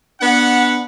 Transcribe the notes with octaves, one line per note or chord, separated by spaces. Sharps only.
B3 D4 F#5